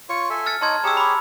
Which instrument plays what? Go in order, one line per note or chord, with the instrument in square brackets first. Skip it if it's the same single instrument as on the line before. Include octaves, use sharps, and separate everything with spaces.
[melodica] F4 C#5 C#6
A4 E5 G#5
[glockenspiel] F6 A6 C#7
[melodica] D#4 C#5 D#5 [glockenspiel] A5 C6 G#6
[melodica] G4 G#4 C#5 [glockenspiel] A#5 E6
[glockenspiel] B5 D6